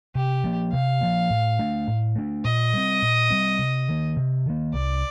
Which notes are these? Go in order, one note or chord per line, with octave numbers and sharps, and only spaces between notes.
C3 G4
F3 A#3
C3 F5
F3 A#3
A2
A3 D4
A2
A3 D4
A#2 D#5
G3 C4
A#2
G3 C4
C3
D#3 A#3
C3
D#3 A#3
C2 D5